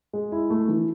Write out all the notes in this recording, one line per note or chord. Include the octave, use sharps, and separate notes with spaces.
G#3
E4
A3
E3